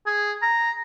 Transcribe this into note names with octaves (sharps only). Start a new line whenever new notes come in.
G#4
A#5